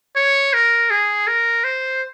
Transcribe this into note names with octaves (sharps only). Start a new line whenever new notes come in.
C#5
A#4
G#4
A#4
C5